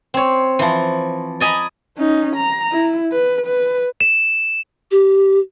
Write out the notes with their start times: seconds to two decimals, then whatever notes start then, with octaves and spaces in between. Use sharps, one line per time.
0.14 C4 C#5
0.59 E3 F3
1.40 D5 D#5 G#5 A#5 B5
1.97 C#4 D#4
2.36 A#5
2.72 E4
3.12 B4
3.46 B4
4.01 E7
4.91 G4